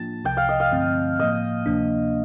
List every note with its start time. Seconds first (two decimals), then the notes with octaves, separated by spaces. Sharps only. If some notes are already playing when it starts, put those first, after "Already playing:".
Already playing: A2 F3 A#3 D4 F4 A5
0.25 C2 C3 F3 G5
0.37 F5
0.49 D#5
0.60 F5
0.71 G2 D3 F3 A3 C4
1.20 A2 F3 A#3 D#5
1.66 D2 C3 F3 A#3 D4